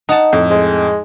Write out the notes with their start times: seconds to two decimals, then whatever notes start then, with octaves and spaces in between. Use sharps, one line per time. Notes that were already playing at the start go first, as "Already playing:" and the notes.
0.09 D#4 F#5 A5
0.33 F2 A2
0.50 G#3